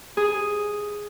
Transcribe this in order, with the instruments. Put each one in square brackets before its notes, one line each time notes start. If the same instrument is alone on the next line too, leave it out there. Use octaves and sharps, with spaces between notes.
[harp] G#4